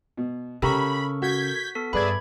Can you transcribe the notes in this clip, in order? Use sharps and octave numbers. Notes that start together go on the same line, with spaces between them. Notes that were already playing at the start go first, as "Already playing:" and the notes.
B2
C#3 G4 A4 A#4 A#5 B5 C#6
F#4 G6 G#6 B6
B3 A4 B6
G2 G#4 B4 D5 E5 B5 G#6